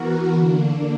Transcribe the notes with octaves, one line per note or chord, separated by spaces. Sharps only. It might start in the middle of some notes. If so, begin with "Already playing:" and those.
Already playing: E3 B3 F#4 A#4
D3 A#3 D4